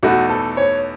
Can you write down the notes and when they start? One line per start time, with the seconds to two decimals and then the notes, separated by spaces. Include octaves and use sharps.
0.03 E2 B2 A3 D#4 F#4
0.29 A4
0.57 C#5